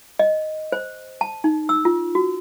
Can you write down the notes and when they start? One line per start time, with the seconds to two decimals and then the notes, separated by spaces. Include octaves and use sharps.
0.19 D#5
0.72 C5
1.21 A5
1.44 D#4
1.69 E6
1.85 F4
2.15 F#4